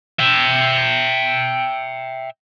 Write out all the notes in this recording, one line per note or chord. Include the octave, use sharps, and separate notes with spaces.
E5 G5